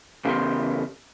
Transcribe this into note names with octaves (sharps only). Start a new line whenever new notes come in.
E2 C#3 B3 G4 A#4 C6